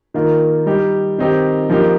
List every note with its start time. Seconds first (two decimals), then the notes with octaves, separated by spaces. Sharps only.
0.14 D#3 A#3 F4
0.66 G3 D#4 G4
1.18 D#3 C4 D#4 G4
1.70 F3 A#3 D#4 G4